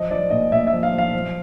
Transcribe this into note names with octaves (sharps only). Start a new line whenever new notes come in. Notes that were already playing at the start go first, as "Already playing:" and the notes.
Already playing: F3 D#5
F3 D5
A#2 D#5
A#2 E5
E5
F3
F5
F3
F5
F3